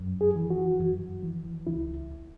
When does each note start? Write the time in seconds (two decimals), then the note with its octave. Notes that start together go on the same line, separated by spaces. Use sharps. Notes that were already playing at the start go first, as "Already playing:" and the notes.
Already playing: F#2
0.21 G#4
0.36 E3
0.50 F#4
0.80 F#2
1.23 E3
1.67 C#2 E4